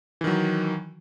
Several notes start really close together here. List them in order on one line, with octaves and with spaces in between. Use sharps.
E3 D#3 F#3